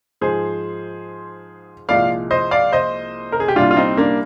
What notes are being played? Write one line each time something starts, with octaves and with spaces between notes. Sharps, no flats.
G#2 F3 G#3 G#4 C5
C2 A#2 F3 G#3 D5 F5
C5 D#5
D5 F5
C5 D#5
A#4
G#4
G4
C2 A#2 G3 D4 F4
F4
C4 D#4
A#3 D4